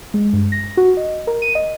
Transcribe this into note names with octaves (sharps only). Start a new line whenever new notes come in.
G#3
G2
A#6
F#4
D#5
A#4
D#7
D#5